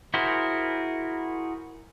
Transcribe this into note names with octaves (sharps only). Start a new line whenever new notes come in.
E4 F#4 G#4 A#4 C5